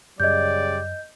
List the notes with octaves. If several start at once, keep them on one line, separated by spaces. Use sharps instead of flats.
F#2 C#3 G3 D5 D#5 G6